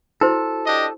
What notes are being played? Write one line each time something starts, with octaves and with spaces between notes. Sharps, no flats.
E4 F#4 A4 C5
D4 G4 D#5